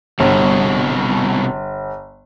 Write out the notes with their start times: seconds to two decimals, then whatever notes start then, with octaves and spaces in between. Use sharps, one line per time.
0.20 G1 C2 B2